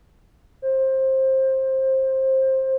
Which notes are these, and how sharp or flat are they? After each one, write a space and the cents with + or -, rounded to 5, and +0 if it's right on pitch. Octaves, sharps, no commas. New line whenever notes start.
C5 +20